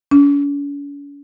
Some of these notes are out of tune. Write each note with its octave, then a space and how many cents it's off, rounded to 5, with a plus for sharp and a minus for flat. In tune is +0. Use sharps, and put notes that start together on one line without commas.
C#4 +45